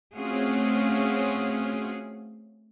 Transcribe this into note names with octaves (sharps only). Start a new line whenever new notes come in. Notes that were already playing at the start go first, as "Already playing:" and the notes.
A3 C4 C#4 F4 F#4 G#4